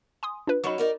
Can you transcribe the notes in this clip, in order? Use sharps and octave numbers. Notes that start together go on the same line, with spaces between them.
G#5 C6 D#6
D4 F4 B4
F#3 C#4 D#4 B5 C#6
D#4 A#4 D5